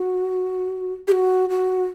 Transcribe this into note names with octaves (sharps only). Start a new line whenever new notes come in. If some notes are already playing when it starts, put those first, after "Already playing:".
Already playing: F#4
G4
F#4
F#4